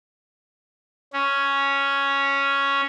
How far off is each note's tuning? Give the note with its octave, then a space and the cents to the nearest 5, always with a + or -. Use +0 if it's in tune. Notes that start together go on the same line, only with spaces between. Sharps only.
C#4 +0